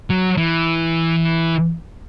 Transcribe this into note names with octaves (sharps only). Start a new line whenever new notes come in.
F#3
E3